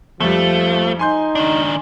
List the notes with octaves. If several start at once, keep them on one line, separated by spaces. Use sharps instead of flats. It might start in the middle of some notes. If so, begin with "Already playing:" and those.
F2 F3 G3 A3
D#4 G#5 C6 G6
D#3 D4